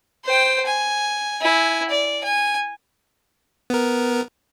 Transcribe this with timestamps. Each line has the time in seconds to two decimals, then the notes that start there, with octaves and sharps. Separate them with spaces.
0.24 C5 G5
0.66 G#5
1.41 E4 G#5
1.90 D5
2.24 G#5
3.70 B3 A#4